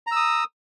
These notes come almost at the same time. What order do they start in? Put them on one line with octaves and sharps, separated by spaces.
A#5 E6 D#6